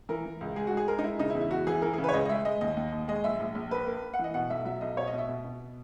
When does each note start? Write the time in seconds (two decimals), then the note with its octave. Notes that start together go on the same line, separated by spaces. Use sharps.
0.09 E3 A#4
0.25 E3
0.41 C#2
0.56 G#3 G#4
0.67 G#2 F#4
0.77 G#4
0.88 G#3 A#4
0.99 D#4
1.04 G#3 E4
1.19 C#3 D#4
1.30 E4
1.35 E2
1.41 E4
1.51 E2 F#4
1.67 E3 G#4
1.82 E3 A#4
1.93 C#3 G#4
2.04 B4 C#5
2.14 C#2 D#5
2.25 D#5
2.29 G#3 E5
2.45 G#3 D#5
2.61 D#2 D#5
2.77 D#2
2.92 D#2
3.08 G#3 D#5
3.24 A#1 E5
3.40 A#1
3.55 A#1
3.71 A#3 B4
3.87 A#3
4.03 A#3
4.14 F#5
4.19 E3 D#5
4.34 B2 F#5
4.50 B1 E5
4.65 F#3 E5
4.81 B1 D#5
4.97 B2 C#5
5.07 D#5
5.13 B2
5.18 E5
5.29 B2
5.44 B2